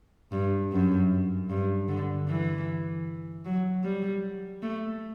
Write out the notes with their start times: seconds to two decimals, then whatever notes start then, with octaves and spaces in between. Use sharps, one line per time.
0.32 G2
0.72 F#2
1.50 G2
1.88 D3
2.28 E3
3.45 F#3
3.84 G3
4.62 A3